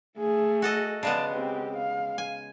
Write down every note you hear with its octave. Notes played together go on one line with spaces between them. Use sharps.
A3 G#4
F#4 A4 D#5
C#3 G#3 B3 D5 A5
C4 G4
F5
G#5